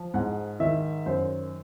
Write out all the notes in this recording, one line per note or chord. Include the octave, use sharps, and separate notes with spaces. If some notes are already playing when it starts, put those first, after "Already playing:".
Already playing: F3
G#2 F#5
D#3 E5
F#2 C5